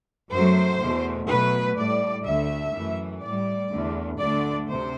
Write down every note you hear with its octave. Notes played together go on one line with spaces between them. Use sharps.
F#2 F#3 A3 C5
E2 B2 A3
B2 F#3 A3 B4
A2 G3 D5
D2 D3 A3 E5
F#2 E3 A3
A2 G3 D5
E2 D3 A3
D2 D3 A3 D5
D2 C3 C5